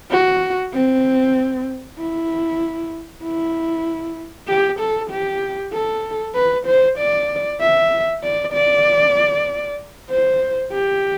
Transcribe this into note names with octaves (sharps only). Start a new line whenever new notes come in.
F#4
C4
E4
E4
G4
A4
G4
A4
B4
C5
D5
E5
D5
D5
C5
G4